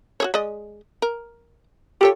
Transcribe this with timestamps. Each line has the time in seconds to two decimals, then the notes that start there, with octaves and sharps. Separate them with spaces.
0.20 F#4 G#4 C#5
0.34 G#3 D5 D#5
1.02 A#4
2.01 F4 G4 A4 C#5